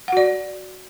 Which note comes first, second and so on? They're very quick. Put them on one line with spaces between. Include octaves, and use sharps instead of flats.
F#5 F#4 D5